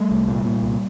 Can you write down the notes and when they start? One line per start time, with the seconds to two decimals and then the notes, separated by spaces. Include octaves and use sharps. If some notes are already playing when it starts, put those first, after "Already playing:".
Already playing: G3 A3
0.11 C2
0.28 A#2
0.45 A#2
0.62 C2